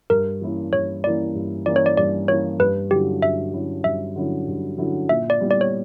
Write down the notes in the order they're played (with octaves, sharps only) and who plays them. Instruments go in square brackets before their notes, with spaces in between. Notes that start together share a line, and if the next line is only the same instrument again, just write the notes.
[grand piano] G2 [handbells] A#4
[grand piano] E3 A#3 C#4 E4
[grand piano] G2 [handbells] C#5
[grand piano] E3 A#3 C#4 E4 [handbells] D5
[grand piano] G2
[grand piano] E3 A#3 C#4 E4 [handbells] D5
[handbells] C#5
D5
[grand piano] G2 [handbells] D5
[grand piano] E3 A#3 C#4 E4 [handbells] C#5
[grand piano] G2 [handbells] B4
[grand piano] D3 F#3 C#4 E4 [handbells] G4
[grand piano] G2 [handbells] E5
[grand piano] D3 F#3 C#4 E4
[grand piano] G2 [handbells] E5
[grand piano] D3 F#3 C#4 E4
G2
D3 F#3 C#4 E4
[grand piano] A#2 [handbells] E5
[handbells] D5
[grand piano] G3 B3 E4
[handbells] D5
C#5